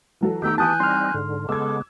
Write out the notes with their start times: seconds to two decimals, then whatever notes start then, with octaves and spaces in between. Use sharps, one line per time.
0.21 E3 F#3 A4
0.42 D#3 A3 B3 G4 A#5 E6 G6
0.58 E3 G#5 A5 D#6 F#6 G6
0.80 G3 C4 D#4 C6 F6
1.14 G#2 D3
1.49 C#3 G#3 B3 A4 D6 E6 G#6